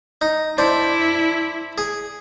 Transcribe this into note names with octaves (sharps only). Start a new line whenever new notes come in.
D#4
D4 E4 C5
G#4